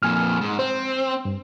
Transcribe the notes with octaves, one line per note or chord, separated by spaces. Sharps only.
F2 A#2 G#5 F6
G#2
C4 C5
G2